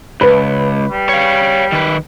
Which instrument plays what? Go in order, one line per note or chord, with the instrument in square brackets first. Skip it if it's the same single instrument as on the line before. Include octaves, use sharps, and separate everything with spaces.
[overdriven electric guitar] C#2 [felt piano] B4
[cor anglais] G3
[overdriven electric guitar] C#5 F5
D#3 B4